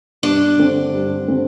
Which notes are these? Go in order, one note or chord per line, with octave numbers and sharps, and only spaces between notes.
G2 D4
D3 C4
G2
D3 C4